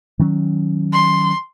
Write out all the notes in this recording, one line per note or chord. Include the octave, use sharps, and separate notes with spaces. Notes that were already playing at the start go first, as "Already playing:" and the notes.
D#3 F#3 C#4
C6